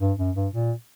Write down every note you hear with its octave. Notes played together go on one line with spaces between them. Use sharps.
G2
F#2
G2
A#2